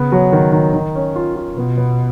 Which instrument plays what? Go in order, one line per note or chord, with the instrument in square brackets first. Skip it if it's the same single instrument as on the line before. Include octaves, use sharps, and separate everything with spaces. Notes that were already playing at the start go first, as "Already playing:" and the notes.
Already playing: [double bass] C#3 [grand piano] B3
[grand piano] F#3
D#3
D#3
D#3
C#4
F4
F4
[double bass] B2 [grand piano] B3
[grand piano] B3